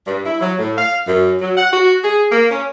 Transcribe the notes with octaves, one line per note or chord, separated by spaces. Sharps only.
G2
E4
F#3
A2
F5
F#2
F#3
F#5
F#4
G#4
A#3
C#4